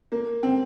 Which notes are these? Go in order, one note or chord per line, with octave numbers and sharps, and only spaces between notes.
A#3
C4